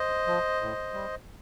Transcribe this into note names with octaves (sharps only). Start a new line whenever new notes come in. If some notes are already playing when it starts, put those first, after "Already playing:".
Already playing: C5 D#5
F3
A2
G3